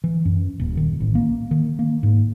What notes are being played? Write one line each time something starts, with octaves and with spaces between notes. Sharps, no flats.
E3
F#2
D#1
D#3
A1
A#3
D#3
A#3
G#2